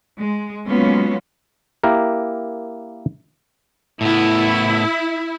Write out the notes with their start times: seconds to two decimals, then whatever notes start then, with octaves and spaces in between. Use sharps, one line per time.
0.19 G#3
0.67 F#3 G#3 A#3 B3 C#4 F4
1.84 A#3 E4 G4 A#4
4.01 A2 B3 E4